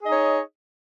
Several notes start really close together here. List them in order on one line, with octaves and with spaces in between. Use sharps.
G#4 D#5 D#4 C#5